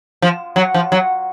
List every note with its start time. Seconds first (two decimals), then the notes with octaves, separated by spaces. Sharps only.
0.22 F3
0.56 F#3
0.74 F3
0.92 F#3